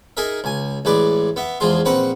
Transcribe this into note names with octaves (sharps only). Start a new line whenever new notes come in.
D#4 G#4 A#4 E5
C#2 G#5
A1 G#3 B4 D5
B3 E5
E2 F3 G#3 F4 C6
A#1 C4 B4 F#5 A#5